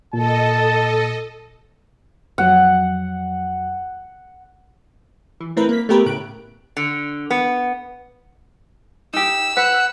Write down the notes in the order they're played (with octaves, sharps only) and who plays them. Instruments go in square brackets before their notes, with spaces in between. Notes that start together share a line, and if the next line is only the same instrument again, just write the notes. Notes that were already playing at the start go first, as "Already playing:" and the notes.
[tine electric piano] A#2 [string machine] A4 D#5 [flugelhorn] A5
[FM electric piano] F2 F#3 [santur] F#5
[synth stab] E3
A3 C4 E4 A#4 B4
A#3 B6
A3 B3 G4 A#4 B4
A2 C#3 F#6 D7
[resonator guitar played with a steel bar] D3
B3
[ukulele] D#4 G4 [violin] E6
[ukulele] B4 [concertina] F#5